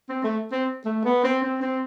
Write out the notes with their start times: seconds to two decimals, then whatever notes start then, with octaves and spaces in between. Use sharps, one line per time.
0.09 C4
0.24 A3
0.52 C4
0.85 A3
1.05 B3
1.24 C4
1.43 C4
1.62 C4